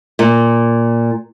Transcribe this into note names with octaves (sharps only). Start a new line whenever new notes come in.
A#2